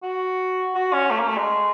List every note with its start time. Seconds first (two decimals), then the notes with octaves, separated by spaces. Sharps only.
0.03 F#4
0.75 F#4
0.93 C#4
1.11 A3
1.19 A#3
1.28 A3
1.37 G#3